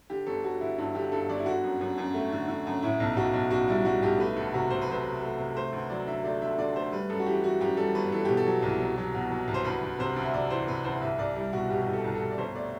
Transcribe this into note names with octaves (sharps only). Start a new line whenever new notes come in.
D3 G4
G1 A4
G1 F#4
D3 E4
G2 E4
D3 G4
G2 A4
G1 D5
E4
D3 F#4
F#2
F#2
F#2
A3
D3
D3
F#2
A2 E4
B1
B1 F#4
B1
B1 F#4
G3 E4
G3 F#4
B1 G4
A3 B4
D2 A4
C3 F#4
C3 C5
B4
F#3 C5
C3
A3
C3
A3 C5
D2 B4
F#3 D5
D3 E5
A3 D5
D3 E5
D3 D5
A3 C5
G3 B4
F#2 A4
F#4
E3 G4
E3 F#4
F#2 G4
G3 A4
G1 B4
E3 A4
B2 G4
A4
F#3
C2
F#3
F#3
B2
F#3
C2
C5
D2 B4
D2
C3 C5
D2
E5
C3 D5
E3 C5
C3 B4
D2 C5
C2 E5
C2 D5
G3 E4
B2 F#4
B2 G4
C2 G4
A4
C2
A4
C2
D5
G1 C5
A3 D5